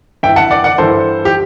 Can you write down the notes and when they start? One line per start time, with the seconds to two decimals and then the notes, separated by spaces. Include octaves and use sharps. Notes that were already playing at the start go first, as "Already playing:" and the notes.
0.23 G2 E3 E5 G5
0.36 F#5 A5
0.51 D5 F#5
0.64 D5 F#5
0.78 G2 E3 A4 C5
1.25 G4